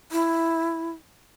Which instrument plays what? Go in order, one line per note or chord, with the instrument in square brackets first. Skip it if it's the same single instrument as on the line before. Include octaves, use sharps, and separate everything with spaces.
[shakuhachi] E4